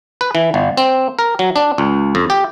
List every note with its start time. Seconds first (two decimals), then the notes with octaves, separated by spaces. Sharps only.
0.21 B4
0.35 E3
0.54 G1
0.77 C4
1.19 A#4
1.39 F#3
1.56 D4
1.78 C#2
2.15 F2
2.30 G4